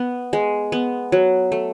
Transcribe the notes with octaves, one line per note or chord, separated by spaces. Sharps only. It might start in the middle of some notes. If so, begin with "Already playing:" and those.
Already playing: B3
G#3
B3
F#3
A3